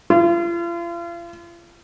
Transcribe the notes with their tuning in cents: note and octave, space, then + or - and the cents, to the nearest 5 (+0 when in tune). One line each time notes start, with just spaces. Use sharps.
F4 -40